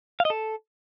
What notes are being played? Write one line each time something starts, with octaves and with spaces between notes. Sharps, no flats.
F5
D#5
A4